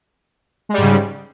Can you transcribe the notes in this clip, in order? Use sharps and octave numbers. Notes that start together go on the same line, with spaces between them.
G#2 C#3 G3 G#3